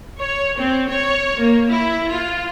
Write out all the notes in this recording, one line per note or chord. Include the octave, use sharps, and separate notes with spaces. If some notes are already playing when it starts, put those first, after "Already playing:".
C#5
C4
C#5
A#3
E4
F4